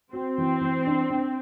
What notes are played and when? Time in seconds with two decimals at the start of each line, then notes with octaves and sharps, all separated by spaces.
0.13 C4 F#4
0.38 E3
0.61 E3
0.87 D4
1.10 D4